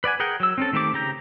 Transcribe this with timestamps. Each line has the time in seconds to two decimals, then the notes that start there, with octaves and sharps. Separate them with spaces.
0.04 B4 D5 F#5 G#5
0.20 G#4 A#4 F#5 G5
0.40 F#3 E6
0.58 C4 C#4 A4
0.73 D#3 A3 C4 G4 D6
0.93 C#3 G4 A#5 G6